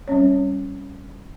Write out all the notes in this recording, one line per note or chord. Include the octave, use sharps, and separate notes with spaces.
G3 C4 C#4 C#5